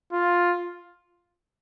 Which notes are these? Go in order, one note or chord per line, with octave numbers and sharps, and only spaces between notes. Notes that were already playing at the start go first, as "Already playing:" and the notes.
F4